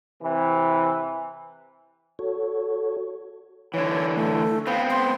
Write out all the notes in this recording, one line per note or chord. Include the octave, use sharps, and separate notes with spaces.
C3 E3
F#4 A4 C#5
D3 E3 C#5
A3
B3 C4 F5
C6